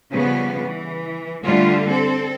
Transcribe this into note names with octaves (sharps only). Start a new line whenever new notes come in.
C#3 F3 G3 B3
E3
D3 G3 A3 F4
C4 A4